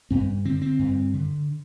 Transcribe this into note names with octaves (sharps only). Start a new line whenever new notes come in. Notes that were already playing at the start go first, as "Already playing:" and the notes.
G2 C4
D3 C4
C4
G2
D3